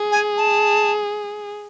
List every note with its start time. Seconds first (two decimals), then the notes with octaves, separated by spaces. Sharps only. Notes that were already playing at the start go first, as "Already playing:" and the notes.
Already playing: G#4
0.12 G#5
0.37 A5